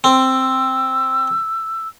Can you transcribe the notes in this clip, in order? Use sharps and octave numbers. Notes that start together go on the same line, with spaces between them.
C4 E6